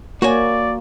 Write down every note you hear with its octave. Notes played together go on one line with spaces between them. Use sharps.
A#3 F#4 C#5 D5 G#5